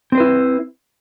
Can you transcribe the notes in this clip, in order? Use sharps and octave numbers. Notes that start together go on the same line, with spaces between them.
C4 E4 B4 C5